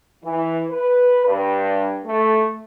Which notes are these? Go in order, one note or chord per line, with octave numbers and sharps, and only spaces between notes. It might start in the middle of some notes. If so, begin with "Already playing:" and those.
E3
B4
G2
A3